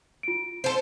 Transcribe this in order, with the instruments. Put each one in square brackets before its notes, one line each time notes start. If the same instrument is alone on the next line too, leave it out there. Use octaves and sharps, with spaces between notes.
[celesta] F4 D7
[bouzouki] A4 C5